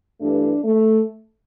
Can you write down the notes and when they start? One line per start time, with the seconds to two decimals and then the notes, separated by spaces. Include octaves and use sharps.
0.21 G2 E3 A3 D4
0.63 A3